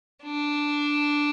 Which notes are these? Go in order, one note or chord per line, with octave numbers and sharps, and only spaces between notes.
D4